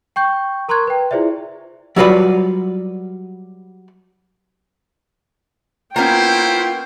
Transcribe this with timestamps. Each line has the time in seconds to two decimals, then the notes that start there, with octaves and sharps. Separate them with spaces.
0.16 G5 C#6 G6
0.68 A#4 A#5 C6 C#6 F#6 G#6
0.87 B4 G5
1.11 E4 F4 G#4 C5 D5 E5
1.96 F#3 G3 F4 F#4 B4 D5
5.96 A#3 B3 C#4 E4 F4 C5 G5